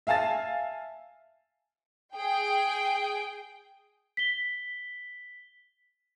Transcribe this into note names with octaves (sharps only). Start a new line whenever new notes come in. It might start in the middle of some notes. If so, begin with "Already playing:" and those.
E5 F5 G#5 A5 A6
G#4 G5
B6 G7